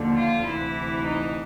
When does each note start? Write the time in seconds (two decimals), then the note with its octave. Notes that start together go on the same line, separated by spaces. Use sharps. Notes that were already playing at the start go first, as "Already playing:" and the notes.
Already playing: D#2 D3 F3
0.14 F4
0.44 D2 C3 E3 E4
1.03 D#4